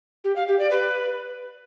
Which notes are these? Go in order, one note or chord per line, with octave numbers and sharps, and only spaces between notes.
G4
F5
G4
D5
B4